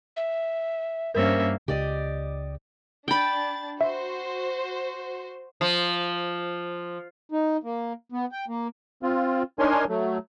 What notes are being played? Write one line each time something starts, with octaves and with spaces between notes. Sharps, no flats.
E5
G2 A#3 C#4 A#4 C5 E5
C#2 C#3 G4 D5 D#5
D4 G5 B5 A6
F#4 C5 E5
F3
D#4
A#3
B3
G5
A#3
C4 F4
D4 D#4 A#4 C#5 G#5 C6
F#3 A3